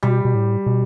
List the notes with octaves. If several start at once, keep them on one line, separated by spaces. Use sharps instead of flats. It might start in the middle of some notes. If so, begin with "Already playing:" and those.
B2 G3
B2
A2
B2